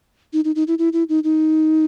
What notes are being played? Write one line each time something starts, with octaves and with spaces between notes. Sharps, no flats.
D#4
D#4
D#4
E4
E4
E4
D#4
D#4